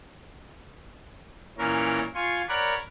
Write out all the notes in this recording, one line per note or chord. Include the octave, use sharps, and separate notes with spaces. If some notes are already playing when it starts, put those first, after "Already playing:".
A#2 E3 C#4 A#4
F4 G#5 C6 C#6
A#4 C#5 D5 F#5 B5